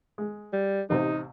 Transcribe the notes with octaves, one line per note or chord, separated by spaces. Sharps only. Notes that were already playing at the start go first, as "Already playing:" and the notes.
G#3
G3
A1 C3 D#4 C5